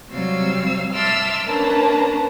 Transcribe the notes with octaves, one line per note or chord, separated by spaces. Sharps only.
C3 F#3 G3 F5 E6
E5 A5 C6 D6 E6 F6
A#3 C#4 D4 B4 A5 A#5